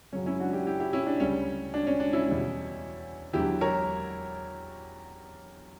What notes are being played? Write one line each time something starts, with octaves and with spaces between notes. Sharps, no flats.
F#2 C#3 F#3 C#4
C#4 E4
D4 F#4
E4 G4
E4 G4
E4 G4
C#4 E4
D4
D2 C#3 G3 C#4
D4
C#4
D4
C#4 E4
E2 B2 G3
E2 D3 F#3 E4 G4
A#4 C#5